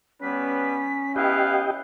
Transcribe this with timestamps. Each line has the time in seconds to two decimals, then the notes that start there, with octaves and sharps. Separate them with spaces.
0.22 G3 B3 C#4 B4 B6
1.16 B3 E4 G4 D#5 F5 G5 F#6